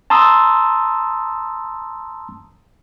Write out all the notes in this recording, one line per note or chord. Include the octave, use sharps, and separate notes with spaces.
A5 A#5 C6 D#6 E6